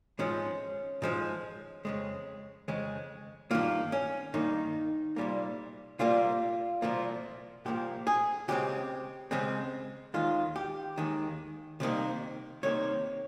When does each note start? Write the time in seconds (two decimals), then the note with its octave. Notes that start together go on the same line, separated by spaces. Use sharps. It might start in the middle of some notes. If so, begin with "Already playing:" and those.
0.19 G#2 F3 G#3 C#4
1.02 G#2 F3 G#3
1.85 F2 C#3 G#3
2.68 F2 C#3 G#3
3.51 G2 D#3 A#3 F4
3.92 C#4
4.34 G2 D#3 A#3 D#4
5.16 C2 A#2 G3 A#3
5.99 C2 A#2 G3 A#3 F4
6.82 C2 A#2 F3 A#3
7.65 C2 A#2 F3 A#3 G4
8.07 G#4
8.48 C#2 C#3 G#3 C4 G4
9.31 C#2 C#3 G#3 C4
10.14 D#2 D#3 G#3 F4
10.56 G4
10.98 D#2 D#3 G#3
11.80 C2 C3 D#3 A#3
12.63 C2 C3 D#3 A#3 C#5